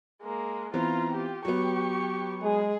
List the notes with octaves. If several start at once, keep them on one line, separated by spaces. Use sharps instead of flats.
G#3 A#3
E3 B3 C4 F4 A#5
F4 G4
F#3 B3 G4 C#6
G#3 G#4